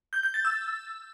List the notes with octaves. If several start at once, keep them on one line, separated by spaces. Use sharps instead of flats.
G6
G6
A6
E6